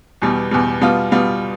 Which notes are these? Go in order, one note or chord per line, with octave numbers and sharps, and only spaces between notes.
E2 B2 G3
E2 B2 G3
B2 G3 B3 F4
B2 G3 B3 F4